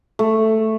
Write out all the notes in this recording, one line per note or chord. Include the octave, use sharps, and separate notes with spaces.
A3